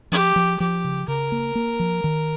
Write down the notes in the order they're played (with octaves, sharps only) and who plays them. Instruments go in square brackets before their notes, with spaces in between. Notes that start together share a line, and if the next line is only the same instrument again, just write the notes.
[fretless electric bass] F3 [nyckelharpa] G4
[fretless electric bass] F3
[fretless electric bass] F3 [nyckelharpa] G4
[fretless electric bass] C#3
[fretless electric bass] C#3 [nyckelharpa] A#4
[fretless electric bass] A#3
A#3
F3
D#3